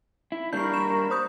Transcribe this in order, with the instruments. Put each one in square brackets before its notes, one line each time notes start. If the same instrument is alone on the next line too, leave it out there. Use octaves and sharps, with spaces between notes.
[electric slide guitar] E4
[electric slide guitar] G3 A#3 D4 [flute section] A#4 B5 C#6 [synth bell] G6 C7
[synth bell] E7
C5 D#6 G6